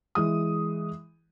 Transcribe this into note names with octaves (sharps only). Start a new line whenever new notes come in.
E3 G#3 D#6